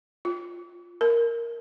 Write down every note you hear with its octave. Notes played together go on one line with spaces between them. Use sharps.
F4
A#4